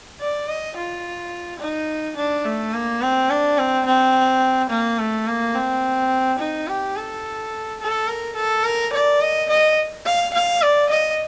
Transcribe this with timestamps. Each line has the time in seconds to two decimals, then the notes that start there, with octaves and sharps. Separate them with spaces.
0.20 D5
0.49 D#5
0.77 F4
1.60 D#4
2.17 D4
2.44 A3
2.73 A#3
3.01 C4
3.30 D4
3.58 C4
3.86 C4
4.70 A#3
4.99 A3
5.27 A#3
5.55 C4
6.39 D#4
6.68 G4
6.96 A4
7.80 A4
8.08 A#4
8.36 A4
8.64 A#4
8.93 D5
9.21 D#5
9.50 D#5
10.05 F5
10.34 F5
10.62 D5
10.90 D#5